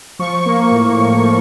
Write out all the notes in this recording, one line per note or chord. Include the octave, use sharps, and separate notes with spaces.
F3 C#6
A#3
A2
A2
F3